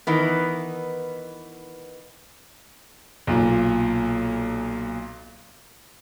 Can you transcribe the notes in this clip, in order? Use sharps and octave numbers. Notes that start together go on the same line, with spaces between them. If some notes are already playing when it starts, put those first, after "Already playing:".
D#3 E3 B3
B1 A#2